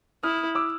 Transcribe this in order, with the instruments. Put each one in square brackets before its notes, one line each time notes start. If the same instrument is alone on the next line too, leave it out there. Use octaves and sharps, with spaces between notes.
[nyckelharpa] E4 [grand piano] D#6 F6
[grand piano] D6 E6